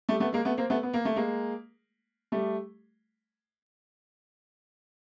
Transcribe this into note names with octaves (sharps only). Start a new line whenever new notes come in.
G3 A3
A3 B3
G#3 A#3
A3 B3
A#3 C4
A3 B3
B3
A#3
A3
G#3 A#3
G3 A3